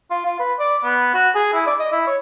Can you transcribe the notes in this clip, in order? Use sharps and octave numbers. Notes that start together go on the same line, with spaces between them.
F4
F4
B4
D5
B3
F#4
G#4
E4
D5
D#5
E4
C#5